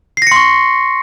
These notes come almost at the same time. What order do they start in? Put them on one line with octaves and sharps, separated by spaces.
C7 A#6 C#7 C6 C#6